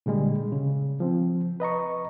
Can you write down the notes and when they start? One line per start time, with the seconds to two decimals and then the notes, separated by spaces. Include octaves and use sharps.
0.06 A#2 D3 G3 G#3
0.52 C#3
1.00 F3 C4
1.60 B4 D#5 A#5 C#6